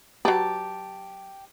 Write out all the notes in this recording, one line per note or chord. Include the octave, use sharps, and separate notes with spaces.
F#3 G4 B4 A5